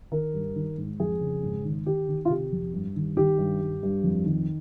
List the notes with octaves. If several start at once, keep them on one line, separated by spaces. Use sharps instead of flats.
D#3 A#4
G2
D#3
G#2
F2 G#4
C#3
G#2
D#3
D#3 G4
D#3
F4
C3 G4
F2
G2
D#3
D#3 G4
G2
G2
G2
F2
D#3